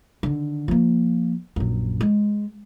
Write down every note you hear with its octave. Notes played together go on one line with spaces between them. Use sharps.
D3 D#3
F3 A#3
A#1 F#2
G#3